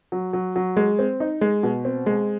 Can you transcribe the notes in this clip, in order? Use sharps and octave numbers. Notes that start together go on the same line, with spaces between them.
F#3
F#3
F#3
G#3
C4
D#4
G#3
B2
C4
G#3